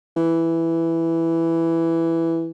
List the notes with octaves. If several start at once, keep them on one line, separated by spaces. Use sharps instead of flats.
E3